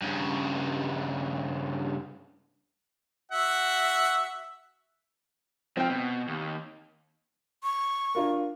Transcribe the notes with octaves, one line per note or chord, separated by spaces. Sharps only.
G2 C#3
F#4 E5 F#5
F3 C4 G5
B2
D#2
C#6
D4 F4 A#4